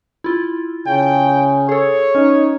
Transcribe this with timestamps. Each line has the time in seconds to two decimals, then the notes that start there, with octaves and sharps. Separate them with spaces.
0.24 E4 F4
0.87 C#3 G5
1.69 G#4 A4 C#5
2.15 C#4 D#4